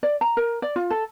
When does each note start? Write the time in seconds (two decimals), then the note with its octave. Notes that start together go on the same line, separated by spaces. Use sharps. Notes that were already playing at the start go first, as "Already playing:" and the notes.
0.03 D5
0.21 A#5
0.37 A#4
0.62 D5
0.76 F4
0.90 A4